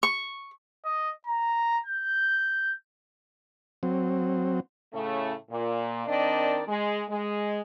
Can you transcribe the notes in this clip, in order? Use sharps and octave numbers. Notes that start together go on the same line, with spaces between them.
C#6
D#5
A#5
G6
F#3 C4
A2 C#3 A3
A#2
D#3 C4 D4 A#4 D5 D#5
G#3
G#3